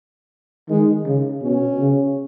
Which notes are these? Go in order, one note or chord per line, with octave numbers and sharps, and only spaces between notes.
D#3 G#3
C#3
B2 C#4
C#3